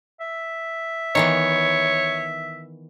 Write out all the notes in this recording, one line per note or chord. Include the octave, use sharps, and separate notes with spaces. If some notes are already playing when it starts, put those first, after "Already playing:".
E5
D#3 E3 B3 C#5